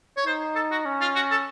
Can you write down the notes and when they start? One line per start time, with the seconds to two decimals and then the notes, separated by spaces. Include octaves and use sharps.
0.17 C#5
0.26 D#4 C5
0.56 A4
0.72 F#4
0.85 C#4
1.01 F4
1.16 F#4
1.31 A4